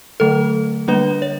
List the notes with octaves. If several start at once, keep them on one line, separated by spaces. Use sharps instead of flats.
D3 F#3 A3 A4
D3 G3 A#3 D4 B4
C#5